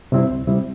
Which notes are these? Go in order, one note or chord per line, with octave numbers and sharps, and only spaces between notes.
C3 G3 C4 E4
D2
C3 G3 C4 E4